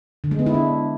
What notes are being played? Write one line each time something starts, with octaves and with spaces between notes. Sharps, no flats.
D3
G#3
B3
E4
D4